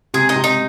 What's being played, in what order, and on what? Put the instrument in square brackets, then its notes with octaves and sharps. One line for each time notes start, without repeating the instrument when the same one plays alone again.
[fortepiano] C3 [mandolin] G#4
[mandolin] D#4
[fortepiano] C3
[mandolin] D#4